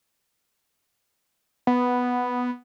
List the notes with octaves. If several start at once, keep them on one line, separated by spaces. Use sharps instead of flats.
B3